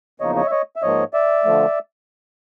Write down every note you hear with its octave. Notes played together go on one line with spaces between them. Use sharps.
E2 C#3 F3 A#3 D#4 C#5 D#5
C#5 D#5
E5
C#5 D#5
E5
G#2 F3 A#3 C#5 D#5
D5 E5
D3 F3 A3